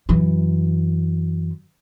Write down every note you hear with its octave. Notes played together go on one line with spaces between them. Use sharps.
F#2 E3